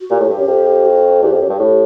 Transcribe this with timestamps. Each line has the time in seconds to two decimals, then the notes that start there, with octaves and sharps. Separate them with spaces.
0.01 F#4
0.10 A#2 G4
0.20 A2
0.29 G2
0.38 F#2
0.47 F2
0.85 F#4
1.23 E2 G4
1.32 F2
1.41 F#2
1.50 G2
1.59 A2